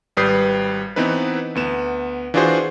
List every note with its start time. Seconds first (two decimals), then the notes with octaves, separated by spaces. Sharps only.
0.17 G#1 G3 B4 D#6 G6 C7
0.96 E3 B3 C4 D#4 B4
1.55 D2 B3 E7
2.34 E3 D4 F4 F#4 G#4 C5